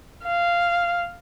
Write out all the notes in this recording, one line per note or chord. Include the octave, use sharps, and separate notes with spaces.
F5